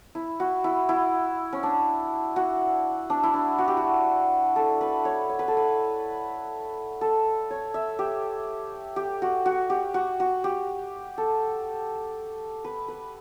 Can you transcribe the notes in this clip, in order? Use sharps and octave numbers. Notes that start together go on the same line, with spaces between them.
E4
F#4
E4
E4
C#4
D4
F#4
D4
E4
D4
F#4
G4
F#4
A4
B4
C#5
C#5
B4
A4
B4
A4
C#5
E5
G4
G4
F#4
F#4
G4
F#4
F#4
G4
A4
B4
B4